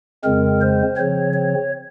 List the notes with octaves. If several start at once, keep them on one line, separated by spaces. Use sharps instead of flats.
F2 C#3 G#3 C4 A#4
C5
C#3 F3 C4 C#5
C#5